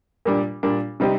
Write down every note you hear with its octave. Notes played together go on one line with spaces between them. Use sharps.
A#2 G3 D4
A#2 G3 D4
C3 G3 C4 D#4 G4